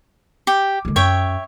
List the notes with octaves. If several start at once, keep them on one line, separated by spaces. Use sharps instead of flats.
G4
D3 G#3
F#2 C#5 E5 G5